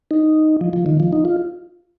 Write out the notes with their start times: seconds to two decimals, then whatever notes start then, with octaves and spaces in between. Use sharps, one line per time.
0.11 D#4
0.61 F3
0.73 F3
0.86 D#3
1.00 F3
1.13 D#4
1.25 F4